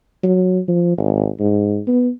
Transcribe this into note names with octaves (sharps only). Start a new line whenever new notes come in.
F#3
F3
G#1
G#2
B3